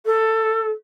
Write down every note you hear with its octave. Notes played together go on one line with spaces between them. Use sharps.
A4